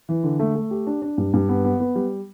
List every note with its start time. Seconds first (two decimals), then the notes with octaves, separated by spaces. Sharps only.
0.09 E3
0.24 D3
0.40 A3
0.55 A3
0.71 G4
0.87 D4
1.02 D4
1.18 G2
1.34 G2
1.49 B3
1.65 B3
1.80 B3
1.95 G3